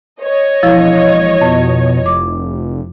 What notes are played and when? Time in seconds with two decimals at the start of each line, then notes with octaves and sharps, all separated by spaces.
0.22 C#5 D#5
0.63 E1 F3 E4 F5
1.41 F2 B2
2.06 F1 D6